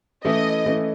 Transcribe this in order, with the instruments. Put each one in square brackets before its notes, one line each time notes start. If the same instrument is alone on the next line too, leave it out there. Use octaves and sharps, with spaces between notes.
[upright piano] E3 A3 C#4 E4 [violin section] D#5
[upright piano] E3 A3 C#4 E4